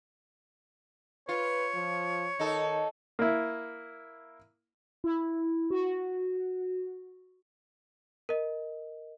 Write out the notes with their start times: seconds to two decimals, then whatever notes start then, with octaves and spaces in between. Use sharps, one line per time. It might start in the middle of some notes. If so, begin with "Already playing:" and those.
1.29 F4 B4 C#5
1.74 F3
2.39 D#3 D#4 A4
3.19 A#3 E4
5.04 E4
5.70 F#4
8.29 A#4 D#5